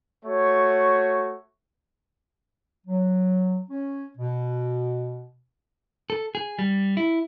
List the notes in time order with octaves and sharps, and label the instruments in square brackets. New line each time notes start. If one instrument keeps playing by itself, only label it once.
[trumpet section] A3 F#4 C#5
[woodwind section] F#3
C#4
B2
[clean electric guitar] A4
G#4
G3
E4